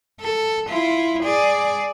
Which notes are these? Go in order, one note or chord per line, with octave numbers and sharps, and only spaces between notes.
A4
E4 F4
G#4 D5